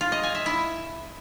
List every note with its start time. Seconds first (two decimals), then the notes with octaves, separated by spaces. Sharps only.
0.01 F4
0.12 D#5
0.23 G#5
0.35 E5
0.46 E4